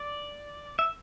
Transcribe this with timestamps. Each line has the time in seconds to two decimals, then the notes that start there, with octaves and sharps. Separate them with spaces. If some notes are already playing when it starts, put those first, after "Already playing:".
Already playing: D5
0.79 E5